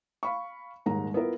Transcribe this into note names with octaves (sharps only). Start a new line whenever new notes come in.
F5 B5 C#6
D#1 D#2 G#2 A#5
B3 E4 F4 A#4